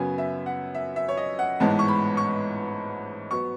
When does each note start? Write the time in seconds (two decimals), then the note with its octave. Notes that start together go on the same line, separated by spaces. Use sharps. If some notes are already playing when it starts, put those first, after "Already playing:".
Already playing: F#2 C#3 F#3 B3 G#5
0.18 E5
0.46 F#5
0.75 E5
0.96 E5
1.08 C#5
1.17 D#5
1.39 F#5
1.60 A1 G#2 E3 G#3 B3 A5
1.79 C#6
1.88 B5
2.17 C#6
3.31 F#3 B3 C#6